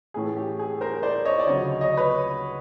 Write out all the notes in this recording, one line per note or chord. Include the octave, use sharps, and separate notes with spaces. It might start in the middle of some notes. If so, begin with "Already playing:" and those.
A2 E3 A3 C#4 G#4
G4
G#4
A#4 C5
C5 D5
C#5 D#5
D5
D2 C#3 F#3 C#5 D#5
C#5 D#5
B4 C#5